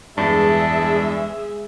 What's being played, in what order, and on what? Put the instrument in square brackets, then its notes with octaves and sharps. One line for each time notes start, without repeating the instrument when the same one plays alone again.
[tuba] E2 [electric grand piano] G2 [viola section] G#3 G#4 E5 [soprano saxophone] D4